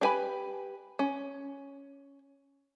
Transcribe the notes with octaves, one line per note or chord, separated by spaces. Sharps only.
D4 G4 B4 G#5 B5
C#4